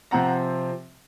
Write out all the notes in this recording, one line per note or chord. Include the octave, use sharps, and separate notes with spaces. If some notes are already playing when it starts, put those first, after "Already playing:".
C3 F3 C4 F#5 A#5